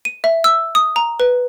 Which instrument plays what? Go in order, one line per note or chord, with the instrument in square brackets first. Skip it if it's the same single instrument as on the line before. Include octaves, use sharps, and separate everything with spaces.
[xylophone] D#7
E5
E6
D#6
A#5
B4